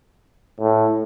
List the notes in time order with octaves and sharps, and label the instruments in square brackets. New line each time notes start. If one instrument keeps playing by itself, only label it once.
[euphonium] A2